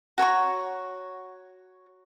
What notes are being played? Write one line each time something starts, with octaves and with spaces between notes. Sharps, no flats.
F#4 C#5 A#5 C#6